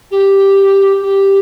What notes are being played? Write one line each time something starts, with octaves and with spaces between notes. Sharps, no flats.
G4
G4